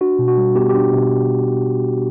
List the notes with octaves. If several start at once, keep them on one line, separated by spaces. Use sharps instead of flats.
D4 F#4
B2
F#4
G3
B3 G4
G4
D4
B2